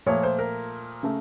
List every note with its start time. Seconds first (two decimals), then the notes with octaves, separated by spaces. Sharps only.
0.06 A#2 F3 A3 C#5
0.23 C5
0.39 A#4
1.03 C#3 A3